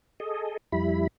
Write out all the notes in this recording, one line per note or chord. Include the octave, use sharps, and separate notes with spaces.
G#4 A4 D#5
F2 G3 E4 B5